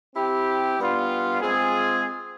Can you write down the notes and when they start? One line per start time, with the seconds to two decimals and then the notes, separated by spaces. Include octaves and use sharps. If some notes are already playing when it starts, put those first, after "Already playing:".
0.14 C4 E4 G4
0.78 G3 B3 D4 F4
1.41 G#3 C4 F4 G#4